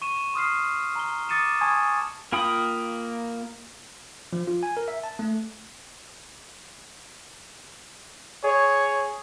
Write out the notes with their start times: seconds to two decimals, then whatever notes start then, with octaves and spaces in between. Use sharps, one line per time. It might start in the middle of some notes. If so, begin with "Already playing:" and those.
0.02 C#6 D#7 E7
0.34 C6 D#6 F6 C7
0.96 A#5 G7
1.29 D6 D#6 A6 C#7 D#7 E7
1.61 G#5 A5 B5 C#6 D#6 G#6
2.32 A#3 F4 G5 B5 D#6
4.33 F3
4.47 F4
4.63 G#5
4.77 A#4
4.88 E5
5.04 A5
5.19 A3
8.44 G#4 C#5